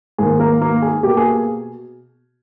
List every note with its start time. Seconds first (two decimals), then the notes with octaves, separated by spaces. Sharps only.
0.18 G#2 D#3 A#3 G#4
0.39 A#3 A#4
0.61 A#3 A#4
0.82 G#4
1.03 B2 A#3 G4
1.17 G#4
1.32 G#4